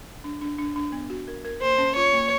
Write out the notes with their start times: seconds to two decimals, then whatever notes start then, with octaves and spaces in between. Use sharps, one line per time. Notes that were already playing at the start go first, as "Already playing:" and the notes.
0.24 D4
0.41 D4
0.59 D4
0.76 D4
0.92 B3
1.10 F#4
1.28 A#4
1.45 A#4
1.62 A#3 C5
1.78 C#4
1.96 F4 C#5
2.13 A#3